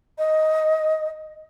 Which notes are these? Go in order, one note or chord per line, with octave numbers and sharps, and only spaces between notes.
D#5